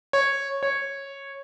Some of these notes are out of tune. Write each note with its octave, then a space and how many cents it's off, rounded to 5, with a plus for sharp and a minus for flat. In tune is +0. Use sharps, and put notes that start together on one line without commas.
C#5 -10
C#5 -10